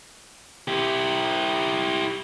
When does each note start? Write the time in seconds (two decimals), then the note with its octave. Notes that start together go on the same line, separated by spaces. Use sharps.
0.68 E4 G4